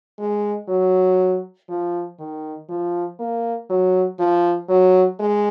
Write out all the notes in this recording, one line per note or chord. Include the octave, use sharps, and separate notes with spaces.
G#3
F#3
F3
D#3
F3
A#3
F#3
F3
F#3
G#3